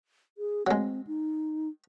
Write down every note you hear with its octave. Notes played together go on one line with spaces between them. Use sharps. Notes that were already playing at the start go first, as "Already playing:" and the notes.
G#4
F#3 G#3 C4
D#4